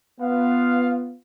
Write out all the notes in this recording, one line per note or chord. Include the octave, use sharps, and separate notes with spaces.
B3 F4 F5